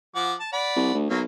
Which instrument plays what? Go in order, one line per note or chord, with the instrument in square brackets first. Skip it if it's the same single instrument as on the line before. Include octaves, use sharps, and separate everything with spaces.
[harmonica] F3 F#5 D6
A5
D5 F#5 B5
[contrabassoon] C2
D2
[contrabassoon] B1 [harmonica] F#3 A#3